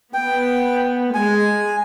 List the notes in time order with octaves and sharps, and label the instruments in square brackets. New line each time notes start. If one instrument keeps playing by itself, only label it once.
[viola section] B3 [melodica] G5
[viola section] G#3 [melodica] G#5